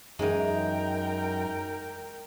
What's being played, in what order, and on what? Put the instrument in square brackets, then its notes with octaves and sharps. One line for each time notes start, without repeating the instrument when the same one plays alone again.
[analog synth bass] F#2 [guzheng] E3 G#3 [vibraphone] D#4 [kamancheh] A#4 G5